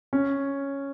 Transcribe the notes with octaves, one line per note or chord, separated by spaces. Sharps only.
C#4